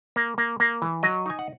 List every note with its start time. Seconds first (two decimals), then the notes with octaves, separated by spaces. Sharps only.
0.16 A#3
0.38 A#3
0.60 A#3
0.82 E3
1.03 F#3 D#5
1.26 D#4 G#5
1.39 F#5